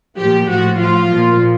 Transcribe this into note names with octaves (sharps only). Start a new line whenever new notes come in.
A#2 F3 G4
A2 F3 F#4
A2 F3 F4
A#2 F3